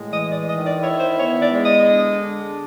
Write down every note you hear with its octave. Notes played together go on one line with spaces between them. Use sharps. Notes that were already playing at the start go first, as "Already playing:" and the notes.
Already playing: A2 G#3
E3 D#5
D5
D#3 D#5
D5
E4 C#5
C5
B3 C#5
D5
G#3
D#5
D3
D4